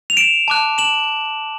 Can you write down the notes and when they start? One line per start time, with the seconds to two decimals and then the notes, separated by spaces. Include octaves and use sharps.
0.10 F7
0.17 D7 E7
0.48 A5 D6 F#6
0.78 E7 F#7